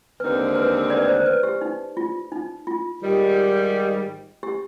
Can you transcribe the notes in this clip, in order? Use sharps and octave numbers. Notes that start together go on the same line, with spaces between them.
D#2 D3 G#3 C4 D#4 B4
B4
B4 D5
D5
C5
B4
G4
D#4
F4
D#4
F4
G#2 D#3 G3
G4